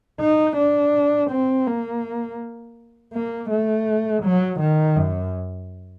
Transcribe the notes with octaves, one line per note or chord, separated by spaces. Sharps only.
D#4
D4
C4
A#3
A#3
A3
F#3
D#3
F#2